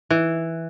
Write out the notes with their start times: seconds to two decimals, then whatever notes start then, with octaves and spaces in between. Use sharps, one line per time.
0.10 E3